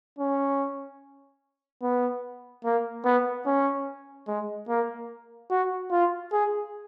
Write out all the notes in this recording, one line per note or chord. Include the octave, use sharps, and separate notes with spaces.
C#4
B3
A#3
B3
C#4
G#3
A#3
F#4
F4
G#4